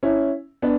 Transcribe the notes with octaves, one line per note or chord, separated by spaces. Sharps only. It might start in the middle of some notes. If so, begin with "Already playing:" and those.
C#4 E4
B3 D4